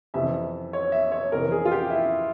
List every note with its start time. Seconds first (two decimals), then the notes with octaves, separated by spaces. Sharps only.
0.14 F2 C3 E3 E5
0.73 C#5
0.92 E5
1.12 C#5
1.31 F2 C3 E3 A#4
1.52 G#4
1.65 F4
1.72 G4
1.90 E4